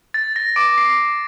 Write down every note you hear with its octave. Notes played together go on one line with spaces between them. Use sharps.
A6
A#6
D6 D7
C7